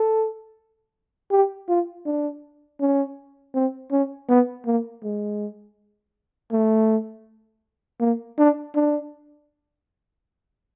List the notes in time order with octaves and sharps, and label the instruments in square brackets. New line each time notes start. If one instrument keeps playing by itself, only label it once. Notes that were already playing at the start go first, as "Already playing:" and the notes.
Already playing: [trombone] A4
G4
F4
D4
C#4
C4
C#4
B3
A#3
G#3
A3
A#3
D4
D4